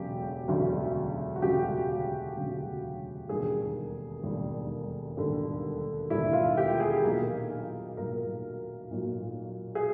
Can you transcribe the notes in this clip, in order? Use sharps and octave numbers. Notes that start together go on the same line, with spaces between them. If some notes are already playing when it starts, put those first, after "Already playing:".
Already playing: E1 D2 C#3 F#3 G4
E1 D2 C#3 F#3
F#4
E1 D2 C#3 F#3 G4
E1 D2 C#3 F#3
E1 D#2 D3 G3 G#4
E1 D#2 D3 G3
E1 D#2 D3 G3
E1 D#2 D3 G3 E4
F4
G4
G#4
B1 A#2 F#3 A#4
B1 A#2 F#3 A#4
B1 A#2 F#3
G#4